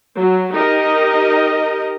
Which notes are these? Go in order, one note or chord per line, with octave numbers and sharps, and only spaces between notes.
F#3
D#4 G4 A#4 D#5